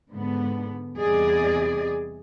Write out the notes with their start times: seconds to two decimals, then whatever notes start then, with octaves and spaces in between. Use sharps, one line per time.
0.11 G#2 D3 B3
0.98 E2 C3 G3 G#4 D5 D#5